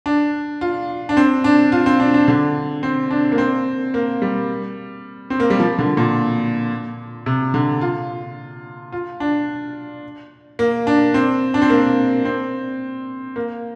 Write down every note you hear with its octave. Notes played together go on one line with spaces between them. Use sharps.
D4
F4
D4
C4
D4
F4
C4
D4
D4
D3
C4
D4
A#3
C4
A#3
G3
C4
A#3
G3
F3
D3
A#2
C3
D3
F4
F4
D4
A#3
D4
C4
D4
C4
A#3
C4
A#3